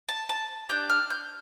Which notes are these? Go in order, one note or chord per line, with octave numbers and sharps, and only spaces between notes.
A5
A5
D4 G4 G6
F6
G6